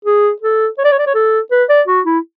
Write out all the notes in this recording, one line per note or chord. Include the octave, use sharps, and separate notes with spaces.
G#4
A4
C#5
D5
C#5
D5
C#5
A4
B4
D5
F#4
E4